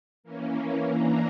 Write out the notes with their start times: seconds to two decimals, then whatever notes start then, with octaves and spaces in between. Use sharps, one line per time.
0.23 E3 A#3 C#4
0.89 E3 A#3 D4 A#4